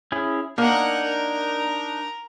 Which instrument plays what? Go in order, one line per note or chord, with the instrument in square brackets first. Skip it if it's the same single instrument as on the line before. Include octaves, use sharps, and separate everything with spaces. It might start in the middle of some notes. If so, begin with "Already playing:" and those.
[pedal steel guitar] C#4 E4 G#4
[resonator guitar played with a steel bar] A#3 [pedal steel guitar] D4 D#4 [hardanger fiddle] A#4 F#5
[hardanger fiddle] A#4